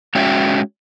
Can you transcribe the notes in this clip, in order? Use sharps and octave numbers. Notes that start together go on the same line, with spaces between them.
G#3 C#4 F#4 C#5 E5 G5